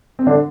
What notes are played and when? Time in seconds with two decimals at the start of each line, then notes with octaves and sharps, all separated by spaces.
0.19 C4
0.27 D3 D4